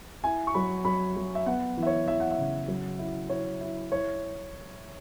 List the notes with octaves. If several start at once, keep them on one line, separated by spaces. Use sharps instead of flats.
E4 G#5
C#6
F#3 B5
F#3 B5
F#3
E5
B3 F#5
E3
E5
C#5
E3 E5
F#5
E5
C#3
F#3
E4
E4 C#5
E4
E4 C#5